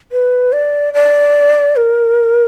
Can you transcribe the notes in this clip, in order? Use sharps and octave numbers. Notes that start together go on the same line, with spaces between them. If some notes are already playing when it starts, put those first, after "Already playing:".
B4
D5
D5
A#4